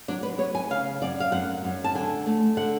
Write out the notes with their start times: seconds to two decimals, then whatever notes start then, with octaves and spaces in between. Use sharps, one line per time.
0.08 F#3 D4
0.23 B4
0.38 B3 C#5
0.55 G#5
0.70 C#3 F5
1.02 F#2 D5
1.20 F5
1.32 F#2 F#5
1.64 F#2
1.84 A5
1.95 D3 G#5
2.26 A3
2.57 D3 F#5